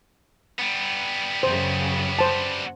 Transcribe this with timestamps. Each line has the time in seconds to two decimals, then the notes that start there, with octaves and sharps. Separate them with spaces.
0.59 G3 B3
1.43 F#2 C#3 C5
2.19 C5 A5